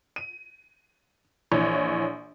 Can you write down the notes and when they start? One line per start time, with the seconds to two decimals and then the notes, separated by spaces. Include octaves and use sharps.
0.16 D#7
1.51 A#1 E3 C#5